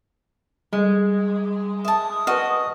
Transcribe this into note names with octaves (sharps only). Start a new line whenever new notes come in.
G3 G#3
E5 A5 D#6
F#4 B4 D#5 C#6 F6